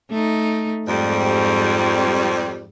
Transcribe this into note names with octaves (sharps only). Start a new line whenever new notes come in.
A3 D#4
F2 G#2 G3